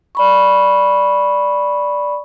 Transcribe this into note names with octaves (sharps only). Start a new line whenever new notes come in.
D5 B5 C#6